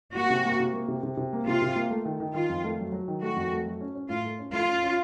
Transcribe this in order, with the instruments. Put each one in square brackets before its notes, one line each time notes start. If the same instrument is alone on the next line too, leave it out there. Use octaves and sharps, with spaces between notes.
[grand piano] A#3 [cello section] F#4
[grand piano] C3
A#3
C3
A#3
C3
C3
C3
A#3
[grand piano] C3 [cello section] F4
[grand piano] C3
A#3
A3
D#3
D#3
[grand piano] D#3 [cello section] F4
[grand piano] F2
A3
F#3
F#3
D#3
[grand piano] A3 [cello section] F#4
[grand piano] F2
A3
F#3
C#4
C#4
[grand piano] A2 [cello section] F4
[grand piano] A3
C#4
[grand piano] A3 [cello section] F4
[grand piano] C#4
C#4